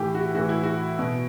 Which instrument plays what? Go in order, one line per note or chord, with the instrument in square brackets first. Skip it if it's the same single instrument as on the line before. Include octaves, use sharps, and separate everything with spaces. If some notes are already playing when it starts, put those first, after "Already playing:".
Already playing: [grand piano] A2 E3 G4
F#4
A2 E3 F#4
E4
F#4
B2